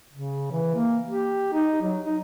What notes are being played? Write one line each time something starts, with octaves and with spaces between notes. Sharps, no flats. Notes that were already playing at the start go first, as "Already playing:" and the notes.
C#3
E3
A#3
G4
D#4
F#3
D#4